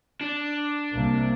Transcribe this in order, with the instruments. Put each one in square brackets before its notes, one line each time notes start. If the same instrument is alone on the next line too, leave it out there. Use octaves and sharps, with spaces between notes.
[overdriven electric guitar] D4
[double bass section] C2 C3 A#3